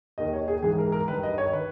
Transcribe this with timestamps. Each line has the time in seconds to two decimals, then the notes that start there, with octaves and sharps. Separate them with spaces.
0.18 D#2 D#3 D#5
0.33 C#5
0.48 G#4
0.62 G#2 E3 G#4
0.78 A#4
0.92 A#4
1.08 G2 D#3 B4
1.23 D#5
1.38 C#5
1.53 D#3 B4